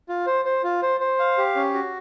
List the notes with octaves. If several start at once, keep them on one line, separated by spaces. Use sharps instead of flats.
F4
C5
C5
F4
C5
C5
F5
G4
C#4
F#4